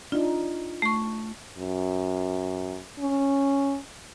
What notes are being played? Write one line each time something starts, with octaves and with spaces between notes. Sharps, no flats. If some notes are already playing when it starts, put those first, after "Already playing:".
D4 D#4 F4
A3 C#6
F#2
C#4